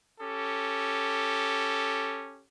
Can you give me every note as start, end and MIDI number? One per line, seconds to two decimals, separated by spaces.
0.19 2.43 61
0.19 2.43 67
0.19 2.43 69